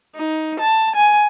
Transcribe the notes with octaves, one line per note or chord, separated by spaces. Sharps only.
D#4
A5
G#5